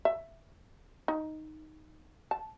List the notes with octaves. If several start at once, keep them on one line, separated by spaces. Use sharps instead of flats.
E5
D#4
A5